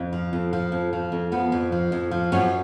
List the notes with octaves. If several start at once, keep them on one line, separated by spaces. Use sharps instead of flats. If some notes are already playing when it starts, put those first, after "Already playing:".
Already playing: F2
F3
F2
F3
F2
F3
F2
F3 B3
F2
F3
F2
F3
F#2 C#4